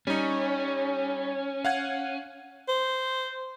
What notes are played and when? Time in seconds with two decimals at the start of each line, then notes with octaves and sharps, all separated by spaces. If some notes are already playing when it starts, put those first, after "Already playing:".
0.07 G3 C#4 D#4
1.65 F5 F#5 G#6
2.68 C5